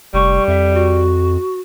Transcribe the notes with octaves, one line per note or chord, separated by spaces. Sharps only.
F1 G3 C#6
F2 E5
F#4